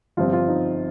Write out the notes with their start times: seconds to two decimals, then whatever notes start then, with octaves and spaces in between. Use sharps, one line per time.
0.17 G1 G2 F3 C4 F4
0.33 F4
0.48 D#4